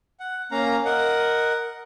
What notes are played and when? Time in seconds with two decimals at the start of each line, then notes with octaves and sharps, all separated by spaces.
0.20 F#5
0.51 A#3 C#4 F5 A#5
0.85 A#4 D#5 F#5